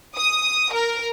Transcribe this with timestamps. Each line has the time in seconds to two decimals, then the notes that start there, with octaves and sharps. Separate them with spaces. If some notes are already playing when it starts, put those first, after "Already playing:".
0.16 D#6
0.73 A#4